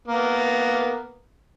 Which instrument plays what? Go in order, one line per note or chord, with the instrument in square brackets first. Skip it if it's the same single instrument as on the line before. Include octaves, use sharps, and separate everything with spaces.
[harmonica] A#3 B3